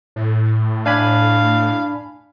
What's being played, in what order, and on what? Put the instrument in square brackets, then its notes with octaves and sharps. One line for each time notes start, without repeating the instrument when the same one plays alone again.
[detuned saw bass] A2
[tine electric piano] D4 G#5 B5 [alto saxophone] F5